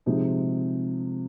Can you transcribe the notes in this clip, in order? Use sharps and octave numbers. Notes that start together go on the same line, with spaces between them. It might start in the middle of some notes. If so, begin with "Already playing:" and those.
C3 F3 G#3 D#4